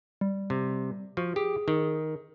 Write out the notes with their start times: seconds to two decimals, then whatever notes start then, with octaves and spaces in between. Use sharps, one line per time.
0.21 G3
0.50 C3
1.17 F3 F#4
1.36 G4 G#4
1.68 D#3